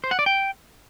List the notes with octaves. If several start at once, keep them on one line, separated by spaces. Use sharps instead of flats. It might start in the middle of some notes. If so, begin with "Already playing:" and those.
C5
F#5
D5
G5